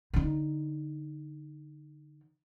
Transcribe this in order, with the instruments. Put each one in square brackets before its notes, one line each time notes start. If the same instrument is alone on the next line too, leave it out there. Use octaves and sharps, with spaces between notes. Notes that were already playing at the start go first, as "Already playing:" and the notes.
[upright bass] D3 D#4